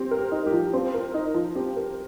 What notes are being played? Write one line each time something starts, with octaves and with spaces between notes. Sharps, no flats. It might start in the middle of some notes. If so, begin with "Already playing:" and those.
Already playing: C4 G4
A#4
G4
D#4
G4
F3
C4 F4
A#4
D#4
F3
C4 G4
A#4